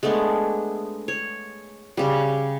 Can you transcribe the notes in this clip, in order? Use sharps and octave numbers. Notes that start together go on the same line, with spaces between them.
G#3 A3 B3 D4
C#5
C#3 G3